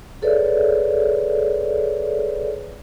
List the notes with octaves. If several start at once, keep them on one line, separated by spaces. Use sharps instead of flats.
G#4 A4 B4 C#5 D5 E5